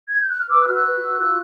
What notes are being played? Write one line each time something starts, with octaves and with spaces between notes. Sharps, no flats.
G#6
G6
F#6
F6
B4 D6 E6
E6 F#6
F#4 F6
E6 F#6
B4
F#4
F4 E6 F#6